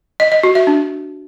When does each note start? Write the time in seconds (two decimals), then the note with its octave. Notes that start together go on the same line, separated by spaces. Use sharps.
0.20 D#5
0.32 D#5
0.43 F#4
0.55 E5
0.67 D4